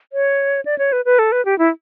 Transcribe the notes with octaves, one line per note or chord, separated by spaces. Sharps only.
C#5
D5
C#5
B4
B4
A4
B4
G4
E4